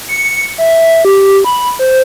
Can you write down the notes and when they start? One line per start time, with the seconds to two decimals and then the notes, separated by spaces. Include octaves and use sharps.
0.09 C#7
0.58 E5
1.05 G4
1.44 B5
1.79 C5